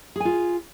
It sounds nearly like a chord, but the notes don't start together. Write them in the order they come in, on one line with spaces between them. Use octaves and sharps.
G#4 G#5 F4